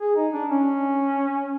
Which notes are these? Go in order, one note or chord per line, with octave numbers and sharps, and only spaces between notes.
G#4
D#4
D4
C#4